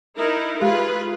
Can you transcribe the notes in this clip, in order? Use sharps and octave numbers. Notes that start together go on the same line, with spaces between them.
D#4 E4 A#4
G#3 F4 G4 G#4 B4 F5